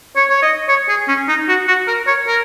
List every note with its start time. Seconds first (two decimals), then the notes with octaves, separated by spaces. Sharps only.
0.16 C#5
0.30 C#5
0.42 D#5
0.69 C#5
0.89 G#4
1.08 C#4
1.28 D#4
1.48 F#4
1.68 F#4
1.87 A#4
2.07 C#5
2.27 A#4